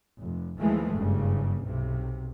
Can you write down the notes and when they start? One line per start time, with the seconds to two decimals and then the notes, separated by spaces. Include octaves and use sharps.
0.19 F1
0.60 D#2 E3 F3 G#3 A3
0.93 F#1 G2 C#3
1.65 B1 C3